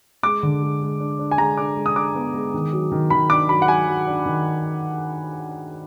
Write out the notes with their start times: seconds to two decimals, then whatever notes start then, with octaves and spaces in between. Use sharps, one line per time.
0.23 G#3 D6
0.43 D3
0.62 G#3
0.81 G#3
1.00 D4
1.19 D4
1.31 G#5
1.38 G#3 A#5
1.57 D4 D6
1.76 G#3
1.86 D#6
1.96 D4 D6
2.15 B3
2.34 G#3
2.54 D#3
2.73 F#3
2.92 D#3
3.10 D#3 B5
3.30 D4 D6
3.49 F#3 B5
3.62 F#5
3.68 F#3 G#5
3.88 F#3
4.07 D4
4.26 D#3